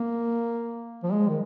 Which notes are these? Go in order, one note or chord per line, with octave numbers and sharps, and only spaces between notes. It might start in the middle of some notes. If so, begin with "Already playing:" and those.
Already playing: A#3
F3
G#3
D#3